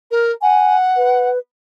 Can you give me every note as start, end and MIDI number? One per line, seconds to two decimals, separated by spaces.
0.11 0.31 70
0.42 1.29 78
0.42 0.76 80
0.97 1.39 71